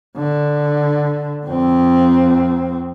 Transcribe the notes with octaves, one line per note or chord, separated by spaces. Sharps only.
D3
F2 C4